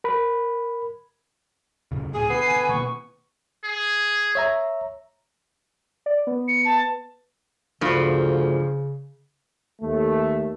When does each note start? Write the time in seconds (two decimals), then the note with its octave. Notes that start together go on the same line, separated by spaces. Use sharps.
0.04 A#4 B5
1.92 F2 C#3
2.14 D2 A2 G#4 G#5
2.30 D3 B3 C7
2.52 D3
2.69 B2 D#3 A#3 C#6
3.64 G#4
4.35 C#5 E5 A#5
6.06 D5
6.27 B3
6.48 C#7
6.65 A5
7.81 D2 G2 C#3 F3
9.81 D#2 A3